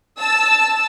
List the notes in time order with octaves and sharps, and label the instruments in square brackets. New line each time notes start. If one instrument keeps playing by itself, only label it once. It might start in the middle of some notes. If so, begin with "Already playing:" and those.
[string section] A5 E6